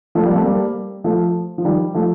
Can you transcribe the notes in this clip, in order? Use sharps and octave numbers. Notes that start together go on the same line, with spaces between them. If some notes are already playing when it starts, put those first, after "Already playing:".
F3 A3
G3 A#3
A3 C4
G3 A#3
F3 A3
F3
D#3 G3
F3 A3